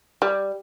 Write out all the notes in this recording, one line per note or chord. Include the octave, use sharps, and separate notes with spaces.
G3